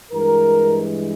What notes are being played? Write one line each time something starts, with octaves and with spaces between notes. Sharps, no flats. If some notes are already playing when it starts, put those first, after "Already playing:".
G2 E3 G#3 A#4